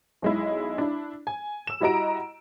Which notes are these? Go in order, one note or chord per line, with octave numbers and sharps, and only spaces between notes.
B1 G#3 E4
D4 E4
G#5
E6 E7
G3 E4 F#4 D#5 A#5 D7